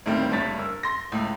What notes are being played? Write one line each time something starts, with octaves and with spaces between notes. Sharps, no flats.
D2 A2 D#3 G3 A#3 C4
F#1 D2 G2 C#5 A6 B6
A#4 E6
C6 A#6
C#2 A2